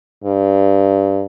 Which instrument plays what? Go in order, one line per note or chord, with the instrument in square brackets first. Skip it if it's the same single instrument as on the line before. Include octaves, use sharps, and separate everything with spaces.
[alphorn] G2